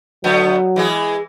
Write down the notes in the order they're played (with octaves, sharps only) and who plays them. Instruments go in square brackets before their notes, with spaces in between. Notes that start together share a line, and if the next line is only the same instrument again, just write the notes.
[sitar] D3 A3 B3 [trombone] F#3
[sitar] E3 G#3 G#4